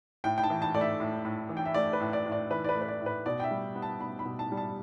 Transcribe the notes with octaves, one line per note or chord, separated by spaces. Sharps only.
A2 G5
G5
A5
E3
A5
A3 D5
E5
A2
A2
E3
G5
E5
A3 D5
B4
A2
D5
A2
D5
E3 B4
D5
B4
A3
B4
D5
A2
B4
B2 D5
G5
E5
G3
B3
A5
B2 B5
B5
B2
A5
G3
A5